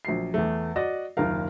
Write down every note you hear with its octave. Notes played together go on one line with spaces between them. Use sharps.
A#1 F#3 C7
E2 A3
F#4 D5 D#5
F#1 D#2 F4 A#4 F5